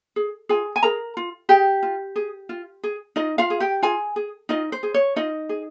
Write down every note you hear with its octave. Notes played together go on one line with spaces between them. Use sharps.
G#4
F4 G#4 G#5
G#5
G#4 A#4 A#5
F4
G4 G#4 G5
F4
G#4
F4
G#4
D#4 F4 D#5
F4 F5
G#4
G4 G5
F4 G#4 G#5
G#4
D#4 F4 D#5
C5
G#4
C#5
D#4 F4 D#5
G#4